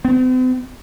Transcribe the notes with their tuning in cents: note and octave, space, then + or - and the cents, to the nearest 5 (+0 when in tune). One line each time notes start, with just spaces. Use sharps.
C4 -45